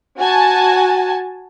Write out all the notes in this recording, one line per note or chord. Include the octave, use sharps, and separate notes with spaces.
F#4 G#5 A5